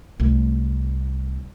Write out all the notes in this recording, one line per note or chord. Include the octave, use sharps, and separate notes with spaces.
C2 A3